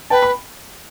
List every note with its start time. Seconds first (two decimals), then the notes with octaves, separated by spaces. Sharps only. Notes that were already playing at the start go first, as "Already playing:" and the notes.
0.10 B4 G5 A5
0.22 B5